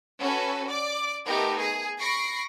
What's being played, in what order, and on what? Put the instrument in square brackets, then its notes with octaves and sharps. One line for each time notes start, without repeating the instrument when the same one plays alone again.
[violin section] C#4 F#4 A4 B4
D5 D6
A3 B3 D#4 G4 A#4
G#4
B5 C#6 A#6 C7 D7